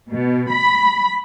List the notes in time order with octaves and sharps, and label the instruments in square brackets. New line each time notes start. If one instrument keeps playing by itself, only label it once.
[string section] B2
B5